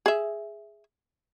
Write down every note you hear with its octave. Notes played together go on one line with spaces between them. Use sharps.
G#4 E5